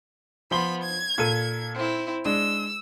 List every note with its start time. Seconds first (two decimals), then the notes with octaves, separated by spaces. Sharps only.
0.51 F3 B3 B5 C6 G7
0.83 G#6
1.18 A#2 A4 D#7
1.75 C4 E4
2.25 G#3 D4 E6